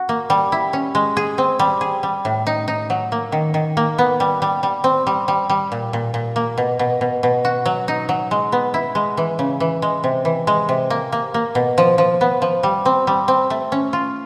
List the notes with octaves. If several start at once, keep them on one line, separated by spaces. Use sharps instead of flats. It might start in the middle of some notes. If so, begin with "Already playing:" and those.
Already playing: F#4
A#3
G3
E4
C#4
G#3
G#4
C4
G3
G#4
G3
A2
D#4
D#4
F#3
A#3
D#3
D#3
A#3
B3
G3
G3
G3
C4
G3
G3
G3
A#2
A#2
A#2
A#3
B2
B2
B2
B2
F#4
F#3
D#4
F#3
G#3
B3
E4
G#3
E3
C#3
E3
G#3
C3
E3
G#3
C3
A#3
A#3
A#3
B2
F3
F3
B3
F3
G3
C4
G3
C4
A3
C#4
F4